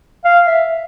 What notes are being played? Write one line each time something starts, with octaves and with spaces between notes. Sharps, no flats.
F5
E5